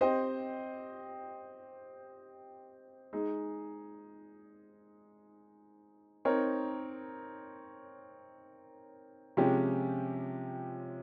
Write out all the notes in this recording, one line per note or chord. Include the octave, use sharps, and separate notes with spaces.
C4 G4 C5 D#5
G#3 D#4 G#4
C4 D#4 A#4 C#5
C3 F3 G#3 C#4 G4